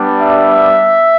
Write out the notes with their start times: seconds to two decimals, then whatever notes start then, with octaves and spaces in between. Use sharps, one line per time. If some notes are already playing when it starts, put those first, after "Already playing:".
Already playing: G3 B3 D4
0.19 E5